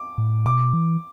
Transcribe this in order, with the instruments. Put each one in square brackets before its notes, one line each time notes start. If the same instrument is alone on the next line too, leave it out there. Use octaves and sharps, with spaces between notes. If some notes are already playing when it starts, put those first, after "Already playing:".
Already playing: [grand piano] D6
[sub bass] A2
[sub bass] B2 [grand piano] D6
[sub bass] E3